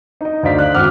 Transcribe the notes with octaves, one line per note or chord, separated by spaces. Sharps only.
D#4 D#5
D2 D#4 C5 D5 F5 B6
F#6
G#1 F#4 D6 F6